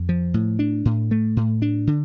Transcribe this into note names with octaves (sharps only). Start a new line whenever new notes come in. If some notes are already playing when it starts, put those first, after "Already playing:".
Already playing: F2
F3
A2
D4
A2
A3
A2
D4
D3